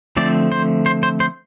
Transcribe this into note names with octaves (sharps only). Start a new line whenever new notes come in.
D3 F3 A3 C4 D5
C5
C5
C5
C5